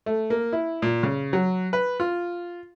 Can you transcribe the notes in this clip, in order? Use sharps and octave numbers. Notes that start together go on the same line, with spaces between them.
A3
A#3
E4
A#2
C#3
F#3
B4
F4